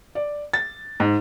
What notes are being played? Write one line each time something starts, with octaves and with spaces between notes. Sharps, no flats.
D5
A6
G#2